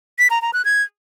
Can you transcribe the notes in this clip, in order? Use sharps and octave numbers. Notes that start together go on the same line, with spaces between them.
B6
A#5
A#5
F#6
G#6